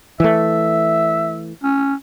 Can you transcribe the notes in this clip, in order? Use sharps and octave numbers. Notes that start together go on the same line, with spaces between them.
E3 A3 E5
C#4